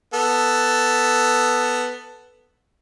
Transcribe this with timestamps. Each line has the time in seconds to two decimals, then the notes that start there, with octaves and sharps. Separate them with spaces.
0.14 B3 A4